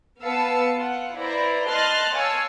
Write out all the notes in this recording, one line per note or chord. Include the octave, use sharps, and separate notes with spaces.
B3 B4 F5 A5 E6 C#7
F4 F#5
E4 B4 C5 D5 A#5
D#5 A5 C6 F6 F#6 A6
C#5 F5 G#5 A5 E6